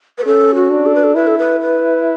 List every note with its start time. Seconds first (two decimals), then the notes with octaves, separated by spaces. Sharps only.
0.18 B4
0.26 C#4 A4
0.55 F#4
0.70 D4
0.86 A4
0.95 B4
1.04 A4
1.15 E4 B4
1.27 A4
1.38 B4
1.61 B4